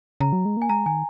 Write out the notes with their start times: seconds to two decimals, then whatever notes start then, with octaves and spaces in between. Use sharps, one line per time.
0.20 C#3 A#5
0.33 F#3
0.45 G#3
0.57 A#3 G#5
0.69 G#3 A#5
0.86 D#3 G#5